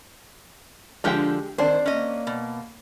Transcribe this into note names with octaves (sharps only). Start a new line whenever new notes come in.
D3 F3 G#3 D4 G4 G5
D#3 C4 D4 C5
A#3 C#4 D#5
B2